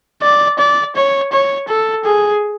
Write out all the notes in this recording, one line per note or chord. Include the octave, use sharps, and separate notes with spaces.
D5
D5
C#5
C#5
A4
G#4